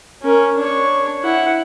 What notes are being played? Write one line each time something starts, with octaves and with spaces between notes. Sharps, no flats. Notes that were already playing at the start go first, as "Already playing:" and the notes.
C#4 A#4
D4 C#5
E4 F#5